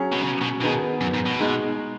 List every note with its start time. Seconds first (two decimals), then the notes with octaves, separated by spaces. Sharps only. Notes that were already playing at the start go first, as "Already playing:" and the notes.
Already playing: F#3 C#4 G#4
0.12 B2
0.23 C#3
0.42 B2
0.61 B2 D#3 B3 D#4 G#4
1.01 F#2
1.14 G#2
1.26 B2
1.39 G#3 D#4 G#4